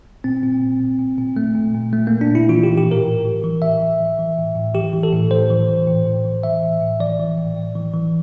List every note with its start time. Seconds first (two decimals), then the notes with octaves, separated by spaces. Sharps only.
0.24 A#2 C4
0.43 A#2
0.61 A#2
0.80 A#2
0.99 A#2
1.18 A#2
1.37 A#2 A3
1.55 A#2
1.74 A#2
1.93 A#2 A3
2.07 A#2 A#3
2.21 D4
2.31 A#2 E4
2.49 E3 F4
2.63 E3 G4
2.77 G4
2.87 A2 A#4
3.06 A2
3.25 E3
3.44 E3
3.62 A2 E5
3.81 A2
4.00 E3
4.19 E3
4.38 A2
4.56 A2
4.74 E3 G4
4.93 E3
5.03 A4
5.13 A2
5.31 A2 C5
5.50 E3
5.69 E3
5.87 A2
6.06 A2
6.25 E3
6.43 E3 E5
6.63 A2
6.81 A2
7.00 E3 D5
7.19 E3
7.38 A2
7.57 A2
7.75 E3
7.94 E3